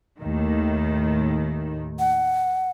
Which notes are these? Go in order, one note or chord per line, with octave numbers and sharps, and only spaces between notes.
D#2 A2 D#3
F#5